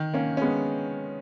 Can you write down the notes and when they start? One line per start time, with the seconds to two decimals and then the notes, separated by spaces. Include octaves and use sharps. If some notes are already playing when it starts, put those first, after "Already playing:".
Already playing: D#3
0.13 A#3 C#4
0.37 C#4
0.41 G#3 B3